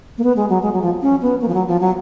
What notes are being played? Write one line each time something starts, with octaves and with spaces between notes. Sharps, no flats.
A#3
B3
G#3
F#3
G#3
F#3
F3
C#4
B3
A#3
F3
F#3
F3
F#3